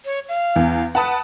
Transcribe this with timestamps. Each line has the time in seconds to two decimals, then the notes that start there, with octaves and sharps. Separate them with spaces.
0.05 C#5
0.29 F5
0.56 E2
0.95 B4 F#5 A5 D#6